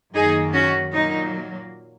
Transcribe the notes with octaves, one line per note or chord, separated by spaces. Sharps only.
F#2 D#3 A#3 D#4 G#4
C#4 F#4
A#2 F#3 A#3 D#4